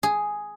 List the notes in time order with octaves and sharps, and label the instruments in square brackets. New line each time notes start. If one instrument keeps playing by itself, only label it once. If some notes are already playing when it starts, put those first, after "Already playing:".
[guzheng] G#4